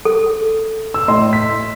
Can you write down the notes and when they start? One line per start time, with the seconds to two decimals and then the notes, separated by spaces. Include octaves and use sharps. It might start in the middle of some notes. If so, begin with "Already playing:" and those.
0.05 A4
0.94 E6
1.08 A2 D#5 C6
1.33 B6